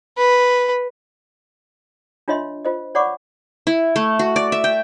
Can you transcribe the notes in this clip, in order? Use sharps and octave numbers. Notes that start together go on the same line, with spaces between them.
B4
D4 F4 C#5 D#5 E5 C6
F4 C5 D#5
C#5 D5 F#5 B5 C#6 D6
E4
A3
F#4
D5
E5
G5